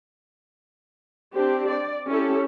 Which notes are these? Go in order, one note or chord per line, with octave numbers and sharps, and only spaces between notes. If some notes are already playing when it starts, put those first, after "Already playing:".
C4 D4 G4
D5
C#4 E4 G4 A4